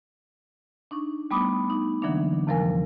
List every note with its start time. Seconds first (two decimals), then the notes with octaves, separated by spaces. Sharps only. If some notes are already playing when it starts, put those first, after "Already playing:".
0.91 D4 D#4 C#6
1.31 G3 A3 B3 B5 D6 D#6
1.70 D#4
2.02 D3 E3 F#3 A#3 D4
2.47 F2 C3 F3 G3 A#4 G#5